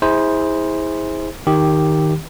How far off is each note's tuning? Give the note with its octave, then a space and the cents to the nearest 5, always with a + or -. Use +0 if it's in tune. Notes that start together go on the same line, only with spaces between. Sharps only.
E4 -35 G#4 -15 C5 +0
D#3 +0 G4 +0